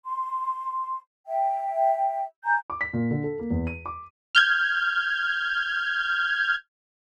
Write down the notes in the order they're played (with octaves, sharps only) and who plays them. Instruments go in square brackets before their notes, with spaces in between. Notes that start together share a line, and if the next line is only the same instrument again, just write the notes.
[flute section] C6
E5 G5
G#5 A#5 G6
[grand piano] D6
B6
A#2
D3
A4
A#3
E2
D#7
D6
[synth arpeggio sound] F6 G6 G#6